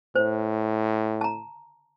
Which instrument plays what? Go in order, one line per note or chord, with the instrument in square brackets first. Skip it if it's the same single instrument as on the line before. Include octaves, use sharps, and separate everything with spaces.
[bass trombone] A2 [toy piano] C5
[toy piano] A5 A#5